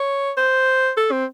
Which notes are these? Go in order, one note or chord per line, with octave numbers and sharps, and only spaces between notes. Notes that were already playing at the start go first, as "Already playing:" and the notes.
Already playing: C#5
C5
A4
C4